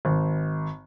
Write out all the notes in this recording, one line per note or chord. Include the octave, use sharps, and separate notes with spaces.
G#1